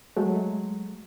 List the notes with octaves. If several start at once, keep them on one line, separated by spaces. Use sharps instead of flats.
F#3 G#3 A3